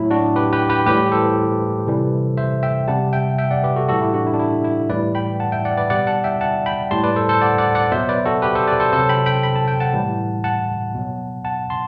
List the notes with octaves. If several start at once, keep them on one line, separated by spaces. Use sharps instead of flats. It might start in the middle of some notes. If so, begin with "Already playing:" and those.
Already playing: A2 F#3 E4
D4 F#4
G4 B4
G4 B4
G4 B4
A2 E3 G3 G4 B4
A4 C5
C3 E3 G3
C5 E5
E5 G5
C3 G3 F#5 A5
E5 G5
E5 G5
D5 F#5
G4 B4
F#4 A4
A2 E3 G3 F#4 A4
E4 G4
D4 F#4
E4
D4
E4
E4
A2 E3 G3 B4 D5
G5 B5
F#5 A5
E5 G5
D5 F#5
B4 D5
B2 G3 D5 F#5
F#5 A5
E5 G5
F#5 A5
G5 B5
A2 G3 A5 C6
B4 D5
A4 C5
A4 C5
D5 F#5
D5 F#5
D5 F#5
B2 F#3 C5 E5
B4 D5
F#4 A4
G4 B4
A4 C5
B4 D5
A4 C5
C3 F#3 A4 C5
G5 B5
G5 B5
B5
A5
G5
F#5 A5
A2 E3 G3
F#5 A5
B2 F#3
F#5 A5
A5 C6